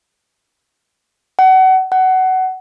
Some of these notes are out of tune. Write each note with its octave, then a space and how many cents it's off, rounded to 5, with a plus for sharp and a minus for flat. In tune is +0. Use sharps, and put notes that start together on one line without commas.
F#5 +30
F#5 +20